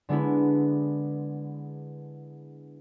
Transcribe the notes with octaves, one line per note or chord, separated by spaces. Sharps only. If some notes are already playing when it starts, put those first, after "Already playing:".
D3 G#3 B3 D4 E4